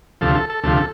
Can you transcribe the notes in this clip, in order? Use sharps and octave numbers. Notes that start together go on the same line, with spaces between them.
D2 C3 F3 A4
A4
A4
D2 C3 F3 A4
A4